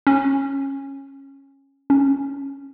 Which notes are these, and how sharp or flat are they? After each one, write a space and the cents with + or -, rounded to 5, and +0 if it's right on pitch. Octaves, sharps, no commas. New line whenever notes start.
C#4 -15
C#4 -5